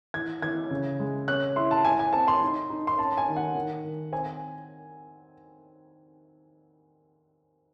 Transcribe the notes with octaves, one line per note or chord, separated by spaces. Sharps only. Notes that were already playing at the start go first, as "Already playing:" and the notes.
E3 G#6
E3 G#6
C#3
G#3
C#4 F#6
E4 C6
A5
E4 G#5
G#5
C4 A5
C6
D#4
D#4
C6
C#4 A5
G#5
D#3
F#5
D#3
D#3
C4 G#5